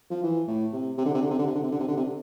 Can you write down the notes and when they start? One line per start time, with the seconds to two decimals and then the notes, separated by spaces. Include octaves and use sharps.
0.11 F3
0.23 E3
0.48 A2
0.73 C3
0.98 C3
1.05 D3
1.14 C3
1.22 D3
1.30 C3
1.39 D3
1.47 C3
1.55 D3
1.63 C3
1.72 D3
1.80 C3
1.88 D3
1.97 C3
2.05 D3